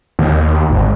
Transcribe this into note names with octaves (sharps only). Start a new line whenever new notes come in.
D#2
G#1